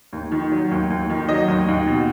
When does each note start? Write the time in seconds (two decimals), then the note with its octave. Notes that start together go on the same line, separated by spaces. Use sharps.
0.13 D#2
0.32 D#3
0.52 F#3
0.71 D#2
0.90 D#2
1.10 D#3
1.28 F#3 D#5
1.48 D#2
1.68 D#2
1.87 B2